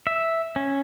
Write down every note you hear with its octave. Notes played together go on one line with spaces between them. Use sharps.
E5
C#4